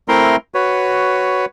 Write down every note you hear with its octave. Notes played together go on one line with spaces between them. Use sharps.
A3 C4 E4 A#4 A#5 C6
F#4 B4 C#5